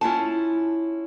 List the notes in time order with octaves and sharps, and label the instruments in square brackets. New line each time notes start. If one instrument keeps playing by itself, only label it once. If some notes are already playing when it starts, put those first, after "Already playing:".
[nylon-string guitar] C#4 E4 F4 A5